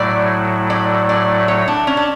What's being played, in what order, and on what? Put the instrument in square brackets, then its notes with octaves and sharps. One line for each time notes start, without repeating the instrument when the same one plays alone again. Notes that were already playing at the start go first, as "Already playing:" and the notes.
Already playing: [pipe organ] A2 F#3 A3 E4 [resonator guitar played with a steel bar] D5
[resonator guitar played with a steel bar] D5
D5
C#5
D4
C#4
D4